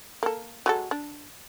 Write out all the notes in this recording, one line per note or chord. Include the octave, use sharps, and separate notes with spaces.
A#3 A4
F#3 G#3 A4
D4